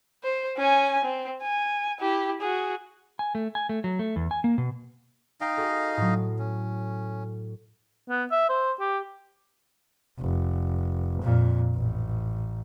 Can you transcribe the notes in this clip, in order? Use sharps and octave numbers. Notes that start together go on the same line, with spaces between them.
C5
C#4 G#5
C4
G#5
E4 G4
F#4 G#4
G#5
A3
G#5
A3
F#3
A3
E2
G#5
A#3
B2
D#4 D#5 F5 G5
F#4 G#4 A4
A2 F#3
C#4
B3
E5
C5
G4
F1
F2 A#2
A1